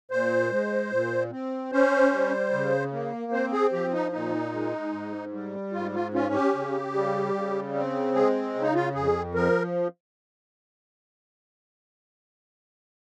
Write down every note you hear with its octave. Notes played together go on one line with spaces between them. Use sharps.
A#2 C5
G#3
A#2
C4
C#4 C5
G3
C#3
A#3
C4 C5
G#4
F3 G4
D#4
A#2 D#4
G#3
G#2
G3
G#2 F4
F4
C#4 F4
G4
C#3
G3
C#3
C4
G#3 G#4
C#3
D#4
F4
F2 G#4
F3 A#4